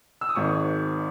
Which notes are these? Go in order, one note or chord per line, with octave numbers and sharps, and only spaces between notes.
E6
D#6
G#1 G#2 D#3 C#6